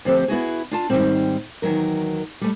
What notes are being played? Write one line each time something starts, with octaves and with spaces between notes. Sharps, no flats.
D2 F3 C4 G4 A4
B3 E4 F#4 G#4
D4 F4 A5
G#2 D#3 E3 F#3 G3 C4
E2 D#3 E3 F#3 A#4
G3 A3